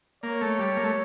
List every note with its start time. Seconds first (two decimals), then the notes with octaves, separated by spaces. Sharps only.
0.23 A#3 C#5
0.41 A3
0.59 G3
0.77 A#3
0.84 A3